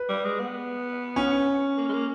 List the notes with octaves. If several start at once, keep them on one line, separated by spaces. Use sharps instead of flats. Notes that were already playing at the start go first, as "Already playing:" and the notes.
Already playing: B4
G3
G#3
B3
C#4
A#3
G#3
A#3